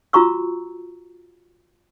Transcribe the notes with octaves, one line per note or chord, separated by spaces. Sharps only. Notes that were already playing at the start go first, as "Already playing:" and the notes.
F4 F#4 A#5 C#6 E6